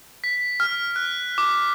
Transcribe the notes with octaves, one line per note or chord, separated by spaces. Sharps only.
B6
F6
F#6
D6